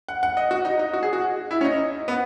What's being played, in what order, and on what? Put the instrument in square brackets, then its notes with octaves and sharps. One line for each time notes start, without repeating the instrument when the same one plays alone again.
[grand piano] F#5
F#5
D#5
F#4
D#4
D#4
F#4
G#4
F#4
E4
C#4
D#4
B3